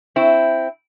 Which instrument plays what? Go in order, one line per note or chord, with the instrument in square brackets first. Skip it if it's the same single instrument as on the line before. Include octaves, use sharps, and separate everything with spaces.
[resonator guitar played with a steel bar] C4 E4